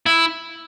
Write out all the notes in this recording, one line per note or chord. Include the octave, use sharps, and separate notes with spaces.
E4